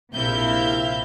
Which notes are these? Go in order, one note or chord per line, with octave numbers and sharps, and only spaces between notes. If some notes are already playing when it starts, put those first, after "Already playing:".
A#1 C3 E4 E5 F5 G6